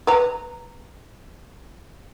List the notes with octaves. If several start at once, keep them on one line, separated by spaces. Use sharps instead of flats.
B4 A#5